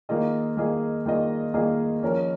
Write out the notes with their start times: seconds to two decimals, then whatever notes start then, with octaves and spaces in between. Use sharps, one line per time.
0.09 D#3 A#3 F4 G#4 D#5
0.57 D#3 A#3 F4 G#4 D#5
1.06 D#3 A#3 F4 G#4 D#5
1.54 D#3 A#3 F4 G#4 D#5
2.03 F3 C#4 A#4